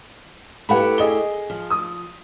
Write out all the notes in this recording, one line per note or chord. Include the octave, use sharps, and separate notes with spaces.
A3 E4 G4 B4 F#5 B5
G#4 D#5 G7
F3
D#6